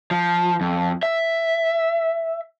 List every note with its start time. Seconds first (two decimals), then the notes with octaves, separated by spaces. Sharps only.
0.11 F3
0.61 F2
1.03 E5